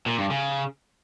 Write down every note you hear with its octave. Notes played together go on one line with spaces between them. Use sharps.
A#2
G2
C#3